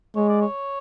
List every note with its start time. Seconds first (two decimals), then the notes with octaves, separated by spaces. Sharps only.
0.15 G#3 C#5
0.28 D5
0.41 C#5